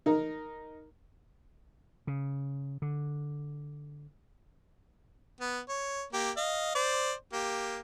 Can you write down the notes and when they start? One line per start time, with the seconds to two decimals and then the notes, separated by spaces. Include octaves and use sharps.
0.06 D#4 A#4
2.07 C#3
2.82 D3
5.41 B3
5.69 C#5
6.13 A#3 G4
6.37 D#5 F5
6.75 C5 D5
7.33 A#3 G4